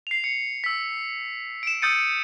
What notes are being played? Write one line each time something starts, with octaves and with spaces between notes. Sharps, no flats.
C7 F7
C#7
E6 B6
D7 E7
D#6 E6 G6 A6 C#7 D#7